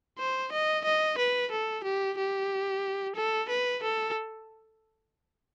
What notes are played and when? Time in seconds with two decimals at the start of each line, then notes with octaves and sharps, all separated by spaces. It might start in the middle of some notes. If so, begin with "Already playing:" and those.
0.19 C5
0.52 D#5
0.84 D#5
1.18 B4
1.51 A4
1.84 G4
2.18 G4
3.16 A4
3.49 B4
3.83 A4